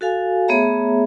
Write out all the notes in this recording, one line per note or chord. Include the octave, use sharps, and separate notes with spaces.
F#4 A4 F5 G#5
A3 B3 G#4 C#5 E5 A#5